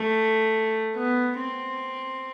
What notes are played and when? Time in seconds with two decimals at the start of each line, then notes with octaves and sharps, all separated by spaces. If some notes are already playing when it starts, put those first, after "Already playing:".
Already playing: A3
0.95 B3
1.37 C4